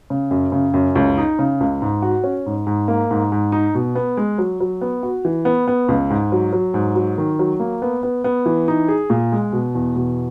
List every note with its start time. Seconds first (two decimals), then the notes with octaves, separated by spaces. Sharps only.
0.10 C#3
0.31 F#2
0.52 C#3
0.74 F#2
0.95 C#2
1.18 D#4
1.39 C#3
1.60 C#2
1.82 G#2
2.02 F#4
2.24 C#4
2.46 G#2
2.67 G#2
2.88 A#3
3.11 G#2
3.32 G#2
3.52 D#4
3.75 B2
3.95 B3
4.17 G#3
4.38 F#3
4.60 F#3
4.81 B3
5.03 F#4
5.25 E3
5.45 B3
5.68 B3
5.88 C#2
6.10 G#2
6.32 F#3
6.53 F#3
6.74 G#2
6.95 F#3
7.18 D#3
7.39 F#3
7.60 A#3
7.82 B3
8.03 B3
8.24 B3
8.46 E3
8.68 D#4
8.88 G#4
9.10 A#2
9.32 G#3
9.52 B2
9.75 E2
9.96 B2